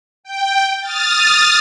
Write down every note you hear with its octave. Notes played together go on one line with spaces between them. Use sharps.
G5
D#6 F6 A6